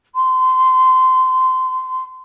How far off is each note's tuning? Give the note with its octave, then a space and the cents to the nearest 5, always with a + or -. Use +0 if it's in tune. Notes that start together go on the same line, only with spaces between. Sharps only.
C6 -20